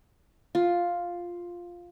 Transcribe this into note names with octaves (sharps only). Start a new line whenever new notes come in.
F4